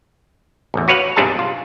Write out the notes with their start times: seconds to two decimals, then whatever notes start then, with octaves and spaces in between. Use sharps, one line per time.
0.74 A1 E2
0.88 F#4 B4 C#5 F5 F#5
1.16 B1 G2 C3 D4 G#4 A5
1.39 F4